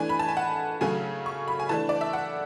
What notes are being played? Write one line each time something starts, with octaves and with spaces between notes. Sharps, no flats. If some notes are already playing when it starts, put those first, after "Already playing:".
Already playing: E3 A3 D4 G#5
B5
A5
G#5
F#5
C#3 F#3 A3 C#4 G#5
C#6
B5
G#5
E3 A3 D4 A5
D5
E5
F#5